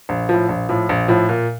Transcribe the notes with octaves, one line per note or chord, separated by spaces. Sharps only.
A#1
A2 F3
A#1
A2 F3
A#1
A2 F3
A#2